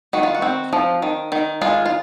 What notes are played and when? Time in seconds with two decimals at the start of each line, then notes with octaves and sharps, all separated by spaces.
0.13 D#3 F#4
0.23 F4
0.35 F#4
0.42 C4
0.73 F3
1.02 D#3
1.32 D#3
1.61 G#3 F4
1.86 F4